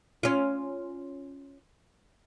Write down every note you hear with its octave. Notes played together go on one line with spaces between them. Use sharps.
C#4 F4